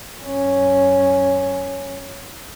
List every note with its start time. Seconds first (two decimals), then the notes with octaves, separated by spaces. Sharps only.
0.20 F#2 C#4